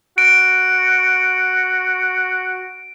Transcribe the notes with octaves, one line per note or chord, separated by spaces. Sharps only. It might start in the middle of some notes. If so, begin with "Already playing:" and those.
F#4 D7